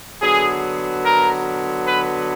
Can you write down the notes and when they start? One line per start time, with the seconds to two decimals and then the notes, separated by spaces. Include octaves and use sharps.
0.21 D3 F#3 B3 G#4
1.04 A#4
1.87 B4